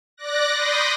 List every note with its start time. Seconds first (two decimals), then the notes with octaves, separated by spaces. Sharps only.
0.17 D5 D6 F#6 A#6
0.53 B5 C6 D6 D#6 G6 A#6